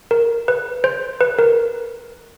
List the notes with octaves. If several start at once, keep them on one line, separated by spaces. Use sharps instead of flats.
A#4
B4
C5
B4
A#4